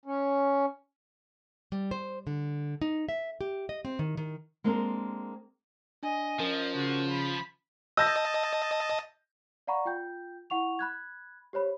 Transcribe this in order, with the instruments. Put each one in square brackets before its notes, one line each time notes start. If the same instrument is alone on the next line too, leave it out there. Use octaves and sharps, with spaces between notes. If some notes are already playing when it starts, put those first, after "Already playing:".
[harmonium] C#4
[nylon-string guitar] G3
C5
D3
D#4
E5
G4
D#5
C4
D#3
D#3
G#3 A#3 C4 D4 A4 A#4
[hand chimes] D4 G#5 [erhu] D#5
[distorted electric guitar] F3 [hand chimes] C#4 A#4
[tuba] C#3 [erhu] F#4
[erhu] B5
[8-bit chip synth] D#5 A5 [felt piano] E6 G6 A#6
[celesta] D5 F5 F#5 A#5 B5 C#6
F4 G5 G6
E4 F#5 C#6 F7
B5 F#6 G#6
G4 C5 C#5 B5